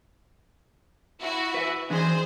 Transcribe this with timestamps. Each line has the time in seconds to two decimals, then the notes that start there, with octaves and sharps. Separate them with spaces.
1.21 E4 F#4
1.54 B4 E5
1.90 E3 D4 G#4 C5